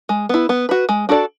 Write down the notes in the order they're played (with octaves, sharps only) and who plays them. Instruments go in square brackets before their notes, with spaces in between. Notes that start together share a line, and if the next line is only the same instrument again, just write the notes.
[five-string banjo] G#3
B3 E4
B3
F#4 B4
G#3
D4 F#4 A4 D5